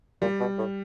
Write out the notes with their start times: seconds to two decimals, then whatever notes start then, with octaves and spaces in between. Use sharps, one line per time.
0.21 A#2 G3
0.40 B2
0.58 A2